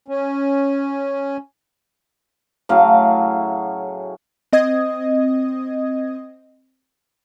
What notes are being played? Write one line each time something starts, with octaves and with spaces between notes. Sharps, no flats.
C#4
A2 C#3 F#3 F5
C4 D#5 D#6 G#6